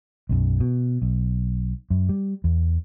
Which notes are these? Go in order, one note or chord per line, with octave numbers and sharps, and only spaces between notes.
B1 F#2
B2
B1
F#2
G3
E2